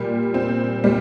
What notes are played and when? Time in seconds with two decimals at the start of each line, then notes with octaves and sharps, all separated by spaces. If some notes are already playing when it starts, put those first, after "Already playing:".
Already playing: A#2 G3
0.34 C4
0.84 A#2 G3